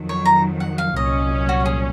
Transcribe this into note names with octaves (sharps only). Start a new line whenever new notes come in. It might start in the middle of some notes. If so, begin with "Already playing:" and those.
Already playing: F2 D#3 F#3
C#5
A#5
F#5
F5
C2 A#2 F#3 C#4 D#5
F#4
G#4